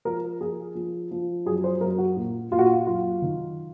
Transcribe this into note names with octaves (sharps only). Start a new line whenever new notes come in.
F3 A#4
F3 G#4
F3
F3
F#2 G#4
C5
F#2 A#4
F#4
A#2
A#2 F4
F#4
F4
F#2 F4
D#3